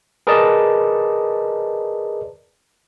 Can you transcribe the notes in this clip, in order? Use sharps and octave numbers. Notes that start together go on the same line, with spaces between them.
G#4 A#4 B4 D5 D#5 A5